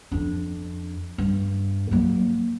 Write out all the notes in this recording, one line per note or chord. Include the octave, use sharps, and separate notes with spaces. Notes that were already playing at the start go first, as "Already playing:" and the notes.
F2 D4
G2
F#3 A#3